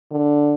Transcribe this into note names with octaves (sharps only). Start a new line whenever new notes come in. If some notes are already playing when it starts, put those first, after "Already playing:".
D3